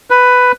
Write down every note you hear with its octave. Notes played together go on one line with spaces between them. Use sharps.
B4